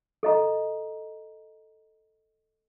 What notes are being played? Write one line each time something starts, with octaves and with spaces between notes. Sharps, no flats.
A4 D#5 A#5